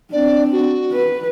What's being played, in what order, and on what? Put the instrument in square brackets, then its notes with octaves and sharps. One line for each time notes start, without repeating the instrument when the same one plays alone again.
[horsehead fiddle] C4 D4 [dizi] D5
[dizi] F#4
[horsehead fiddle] B4